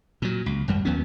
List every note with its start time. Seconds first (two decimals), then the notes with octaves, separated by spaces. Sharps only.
0.22 A#2 F#3
0.46 C#2
0.68 G#1 F#2 G3
0.85 D#2 F#3 B3 C#4